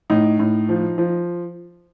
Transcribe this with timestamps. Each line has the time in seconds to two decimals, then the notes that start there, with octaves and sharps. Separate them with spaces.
0.10 A2 D#4
0.39 A2
0.69 F3
0.98 F3